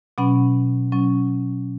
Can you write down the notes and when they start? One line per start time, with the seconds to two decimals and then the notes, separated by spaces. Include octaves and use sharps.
0.18 B2 F#3 C#4 F#5 B5
0.92 B2 F#3 C#4